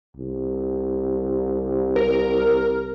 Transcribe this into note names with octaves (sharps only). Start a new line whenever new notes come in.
C2
A#4